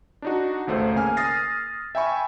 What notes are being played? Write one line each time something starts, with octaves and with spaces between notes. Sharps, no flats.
D4 D#4 F#4
G#1 C#2 A3 C5
C#3 A#3 G#5 F6
D#6 F6 A6 A#6 C7
E5 G5 G#5 B5 C#6